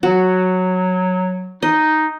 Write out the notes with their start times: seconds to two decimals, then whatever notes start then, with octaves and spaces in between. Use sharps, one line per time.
0.03 F#3 F#4
1.62 D#4 D#5